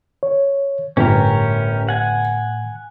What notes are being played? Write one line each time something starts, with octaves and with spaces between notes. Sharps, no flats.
C#5
G1 A2 C#4 G4 A#4
F#5 G#5